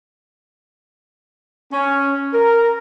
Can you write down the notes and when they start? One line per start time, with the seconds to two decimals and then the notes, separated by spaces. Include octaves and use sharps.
1.72 C#4
2.34 A#4